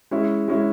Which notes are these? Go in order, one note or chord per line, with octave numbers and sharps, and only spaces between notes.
G#3 C#4 E4
G#3 C#4 E4